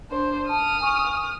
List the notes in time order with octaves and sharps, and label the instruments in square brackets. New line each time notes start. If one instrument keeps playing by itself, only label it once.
[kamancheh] D4 C5
[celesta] A5 [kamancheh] D#6 F6
[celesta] G#5 C#6